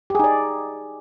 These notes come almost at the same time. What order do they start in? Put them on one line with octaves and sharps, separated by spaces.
G4 G#4 D#4 D5